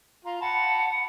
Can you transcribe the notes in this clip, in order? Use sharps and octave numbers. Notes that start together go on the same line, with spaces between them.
F4 A#5
F#5 A5 B5